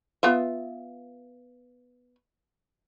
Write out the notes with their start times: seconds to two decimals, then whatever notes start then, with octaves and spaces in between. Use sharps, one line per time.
0.23 B3 F4 E5